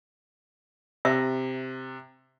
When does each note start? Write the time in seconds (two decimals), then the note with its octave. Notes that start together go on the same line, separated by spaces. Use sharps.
1.05 C3 E5